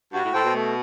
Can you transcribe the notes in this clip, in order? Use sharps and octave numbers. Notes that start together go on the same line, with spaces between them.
G2 F#4
A2
A2 A4 C5 G5
B2
A3